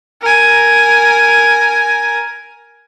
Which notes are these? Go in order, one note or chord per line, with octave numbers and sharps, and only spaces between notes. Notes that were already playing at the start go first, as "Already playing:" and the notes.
A#4 G#5